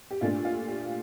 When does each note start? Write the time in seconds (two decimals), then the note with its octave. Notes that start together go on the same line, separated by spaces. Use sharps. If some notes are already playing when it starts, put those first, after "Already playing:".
0.11 G4
0.21 A#2 A3 D4 F4
0.45 F4
0.68 G4